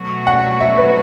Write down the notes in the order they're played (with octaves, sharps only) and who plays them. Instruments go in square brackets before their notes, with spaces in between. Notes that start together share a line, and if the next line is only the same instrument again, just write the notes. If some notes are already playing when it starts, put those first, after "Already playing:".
Already playing: [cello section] B2 F#3 A3 F#4
[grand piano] F#5
E5
B4